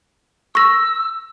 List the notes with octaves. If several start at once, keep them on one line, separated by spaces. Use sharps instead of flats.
C#6 E6 A#6